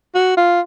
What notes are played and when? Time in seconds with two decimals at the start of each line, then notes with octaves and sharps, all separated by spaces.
0.15 F#4
0.37 F4